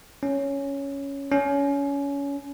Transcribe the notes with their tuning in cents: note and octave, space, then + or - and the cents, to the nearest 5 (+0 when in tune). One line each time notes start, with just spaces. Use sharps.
C#4 +5
C#4 +25